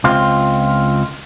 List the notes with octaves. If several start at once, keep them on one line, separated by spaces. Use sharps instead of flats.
C#2 C4 F4